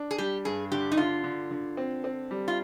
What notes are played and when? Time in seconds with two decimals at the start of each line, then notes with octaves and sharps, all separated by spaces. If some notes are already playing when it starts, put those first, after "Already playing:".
Already playing: D4
0.11 G#4
0.18 G3 G4
0.45 G2 G#4
0.71 D3 G4
0.92 D#4
0.97 D3 F4
1.24 D3
1.51 D3
1.77 C4
2.04 C4
2.31 G3
2.48 F4